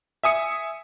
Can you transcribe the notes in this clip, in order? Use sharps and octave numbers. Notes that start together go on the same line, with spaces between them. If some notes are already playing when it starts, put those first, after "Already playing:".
E5 G#5 D#6 C#7